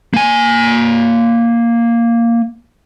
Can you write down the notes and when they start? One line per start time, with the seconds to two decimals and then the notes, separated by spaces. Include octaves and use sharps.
0.14 A#3 G#5